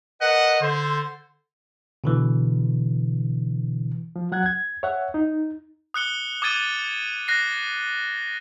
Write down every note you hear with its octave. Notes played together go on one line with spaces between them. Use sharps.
A#4 B4 D#5 F#5
D3 C5
B2 D3 E3
F3
F#3 F#5 F#6 G#6
G#6
C#5 E5 F#5
D#4
D#6 F#6 C#7 G7
D6 D#6 G#6 A6 D#7 G7
F#6 A#6 C7